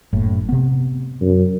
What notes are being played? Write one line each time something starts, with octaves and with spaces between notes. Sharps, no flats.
F#1 A2
C3 B3
F#2